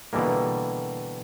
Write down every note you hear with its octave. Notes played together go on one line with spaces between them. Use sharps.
B2 D3 E3 G3 A#3